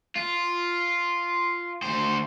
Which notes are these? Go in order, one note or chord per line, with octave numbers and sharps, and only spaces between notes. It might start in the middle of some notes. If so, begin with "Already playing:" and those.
F4
D2 C5